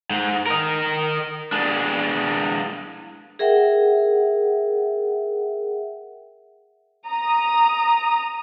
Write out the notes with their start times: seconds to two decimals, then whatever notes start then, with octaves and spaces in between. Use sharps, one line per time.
0.10 G#2
0.46 A#4 D#5
1.52 G#3 D4
3.39 G#4 A#4 E5 F#5 G5
7.07 A#5 D#6